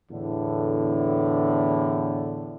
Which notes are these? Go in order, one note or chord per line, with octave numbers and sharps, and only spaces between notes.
E2 A2 D3